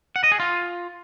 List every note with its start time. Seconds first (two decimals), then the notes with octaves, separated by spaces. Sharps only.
0.16 F#5
0.24 D#5
0.32 G#4
0.40 F4